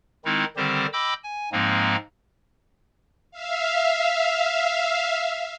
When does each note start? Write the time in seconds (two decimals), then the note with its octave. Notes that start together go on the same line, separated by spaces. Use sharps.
0.25 D#3 G#3 C4 D#4 E4
0.57 D3 D#3 G3 C4 G4 C5
0.93 D#5 G5 B5 D6 E6 G6
1.23 G#5
1.52 G#2 F3 G#3 A#3 C4 D#4
3.31 E5 F5